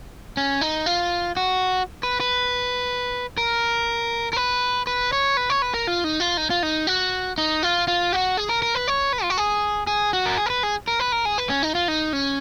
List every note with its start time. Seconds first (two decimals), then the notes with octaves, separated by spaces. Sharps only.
0.37 C#4
0.61 D#4
0.86 F4
1.37 F#4
2.03 B4
2.20 B4
3.38 A#4
4.33 A#4
4.37 B4
4.87 B4
5.13 C#5
5.37 B4
5.50 C#5
5.62 B4
5.74 A#4
5.87 F4
6.04 D#4
6.20 F4
6.37 D#4
6.50 F4
6.63 D#4
6.87 F#4
7.38 D#4
7.63 F4
7.88 F4
8.13 F#4
8.37 G#4
8.49 A#4
8.62 A#4
8.75 B4
8.88 C#5
9.13 B4
9.23 F4
9.30 F#4
9.38 G#4
9.87 G#4
10.13 F#4
10.26 A#4
10.38 G#4
10.46 A#4
10.50 B4
10.63 G#4
10.88 A#4
11.00 B4
11.12 A#4
11.25 G#4
11.38 B4
11.50 C#4
11.63 D#4
11.75 F4
11.88 D#4
12.13 C#4